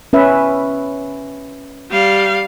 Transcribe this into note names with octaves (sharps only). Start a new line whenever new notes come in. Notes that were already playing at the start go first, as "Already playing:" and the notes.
C#4 B4 E5
G3 F5